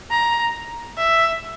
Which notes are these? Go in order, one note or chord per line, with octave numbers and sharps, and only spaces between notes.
A#5
E5